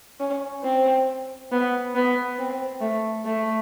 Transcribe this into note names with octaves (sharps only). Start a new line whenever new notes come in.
C#4
C4
B3
B3
C4
A3
A3